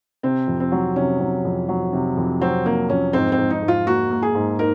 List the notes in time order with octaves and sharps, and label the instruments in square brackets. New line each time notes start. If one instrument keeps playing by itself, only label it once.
[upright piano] C3 [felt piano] C4
[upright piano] F2
[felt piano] C4
[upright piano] F#3
[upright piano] C3 [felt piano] C#4
[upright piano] F#3
F2
F#3
C3
F2
[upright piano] F#3 [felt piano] C4
[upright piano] C3 [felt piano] A#3
[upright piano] F2 [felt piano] C#4
[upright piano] G#2 [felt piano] C4
[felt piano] C4
[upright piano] G#2
[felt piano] D#4
[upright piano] G#2
[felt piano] F4
[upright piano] A#3 [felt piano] F#4
[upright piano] A#3
[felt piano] G#4
[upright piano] G#2
[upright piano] D#4 [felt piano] A#4